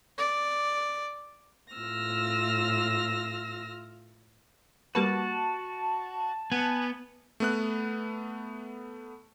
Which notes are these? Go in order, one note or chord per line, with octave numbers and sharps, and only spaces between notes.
D5
A2 F4 E6 F6 A#6
G3 A#3 F#4 B4 A5
B3 G#5
A3 B3 F#6